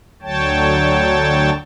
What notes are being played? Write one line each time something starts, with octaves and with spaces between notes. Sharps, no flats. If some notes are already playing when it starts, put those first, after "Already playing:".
D2 D3 F#3 C#5 G5 A5